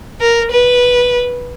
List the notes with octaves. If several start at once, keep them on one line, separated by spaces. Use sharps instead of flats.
A#4
B4